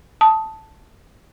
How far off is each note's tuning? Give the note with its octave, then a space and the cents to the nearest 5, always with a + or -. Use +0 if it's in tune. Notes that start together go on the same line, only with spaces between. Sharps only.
A5 +0 D#6 +15